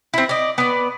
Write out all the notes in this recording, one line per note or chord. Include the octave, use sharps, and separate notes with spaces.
C4 E4
D5 D#5
B3 D5